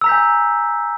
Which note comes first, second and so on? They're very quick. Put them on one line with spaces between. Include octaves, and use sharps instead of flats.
E6 A#5 B6 G6 G#5